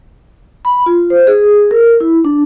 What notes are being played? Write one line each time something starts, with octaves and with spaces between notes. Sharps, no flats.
B5
F4
C5
G#4
A#4
E4
D4